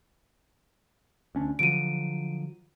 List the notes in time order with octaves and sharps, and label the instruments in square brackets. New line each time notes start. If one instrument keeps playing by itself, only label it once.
[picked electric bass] D2 C#4 D4
[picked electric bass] D3 F3 F#3 [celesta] D7 D#7